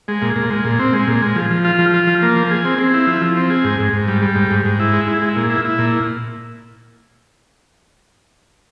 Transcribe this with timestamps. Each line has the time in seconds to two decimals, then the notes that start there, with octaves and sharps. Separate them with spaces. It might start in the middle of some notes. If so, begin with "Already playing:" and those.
0.08 G#3
0.22 A#2
0.36 A#2
0.50 G#3
0.65 A#2
0.79 C4
0.93 G#3
1.08 A#2
1.22 G#3
1.36 F3
1.51 F3
1.65 F4
1.79 F3
1.94 F4
2.07 F3
2.22 A#3
2.36 F3
2.51 G#4
2.65 C4
2.78 C4
2.94 E4
3.07 F3
3.21 F3
3.37 C4
3.50 G#4
3.64 G#2
3.80 G#2
3.93 G#2
4.08 G3
4.22 G3
4.36 G#2
4.51 G#2
4.65 G#2
4.80 E4
4.93 G#3
5.08 E4
5.22 G#3
5.36 A#2
5.50 E4
5.65 E4
5.79 A#2